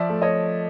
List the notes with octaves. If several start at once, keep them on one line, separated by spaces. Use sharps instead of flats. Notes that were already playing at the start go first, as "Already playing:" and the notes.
Already playing: F3 D5 E5
A3
C#5 D#5